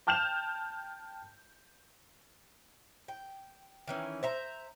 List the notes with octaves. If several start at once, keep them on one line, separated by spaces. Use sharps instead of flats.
G5 A5 F6 G6 E7 F7
G5
D#3 E3 C#4
C5 E5 A#5